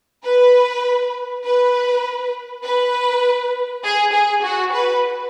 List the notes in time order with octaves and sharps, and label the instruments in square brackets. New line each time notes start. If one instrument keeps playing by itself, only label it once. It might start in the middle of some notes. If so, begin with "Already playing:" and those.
[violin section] B4
B4
B4
G#4
G#4
F#4
B4